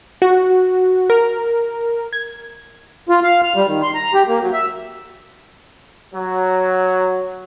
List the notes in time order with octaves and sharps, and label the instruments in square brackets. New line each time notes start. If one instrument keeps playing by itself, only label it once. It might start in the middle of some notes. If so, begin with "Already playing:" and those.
[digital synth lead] F#4
A#4
G#6
[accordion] F4
F5
F6
G3
D#3
C6
A#5
G4
A#3
F#3
E5
[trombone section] F#3